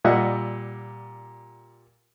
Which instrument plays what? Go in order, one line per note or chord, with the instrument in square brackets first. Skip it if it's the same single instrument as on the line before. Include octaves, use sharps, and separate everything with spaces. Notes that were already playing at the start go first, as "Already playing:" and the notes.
[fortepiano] A#2 G3 D#5 E5 F#5